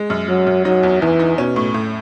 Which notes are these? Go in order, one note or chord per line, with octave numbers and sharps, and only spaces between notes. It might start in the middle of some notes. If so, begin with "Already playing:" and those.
Already playing: G#3
F#2
F#3 G#3
F#2
F#3 D#4
E2
E2 E3
D#4
B2 C#4
A2
A2